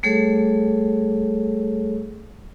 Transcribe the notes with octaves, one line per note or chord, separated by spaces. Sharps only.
G3 A3 G#4 A4 C#5